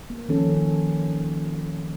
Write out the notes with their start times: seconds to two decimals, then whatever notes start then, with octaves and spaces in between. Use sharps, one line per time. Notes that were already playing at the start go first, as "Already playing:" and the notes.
0.10 A#3
0.29 D#3 F3 A#3 C#4 A4